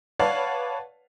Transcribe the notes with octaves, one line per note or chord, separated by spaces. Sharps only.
B4 C#5 D5 F5 F#5 A5